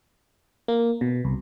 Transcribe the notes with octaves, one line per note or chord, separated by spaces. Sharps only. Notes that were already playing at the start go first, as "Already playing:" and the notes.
A#3
B2
C2